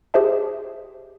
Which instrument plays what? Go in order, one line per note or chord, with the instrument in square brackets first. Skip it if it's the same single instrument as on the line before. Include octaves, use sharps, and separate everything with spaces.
[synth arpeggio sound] G4 G#4 C5 D#5 E5 A5